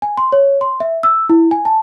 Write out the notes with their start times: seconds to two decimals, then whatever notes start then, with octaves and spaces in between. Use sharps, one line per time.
0.02 G#5
0.18 C6
0.32 C#5
0.61 C6
0.80 E5
1.03 E6
1.29 E4
1.51 G#5
1.65 A5